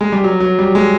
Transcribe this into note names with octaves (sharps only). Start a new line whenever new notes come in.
G#3
G3
F#3
F#3
G3
G#3